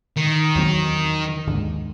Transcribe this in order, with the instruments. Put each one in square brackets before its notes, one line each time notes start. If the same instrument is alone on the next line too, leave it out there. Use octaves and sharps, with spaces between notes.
[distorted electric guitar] D#3
[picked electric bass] E2 F#3 C4
D#2 G#2 D3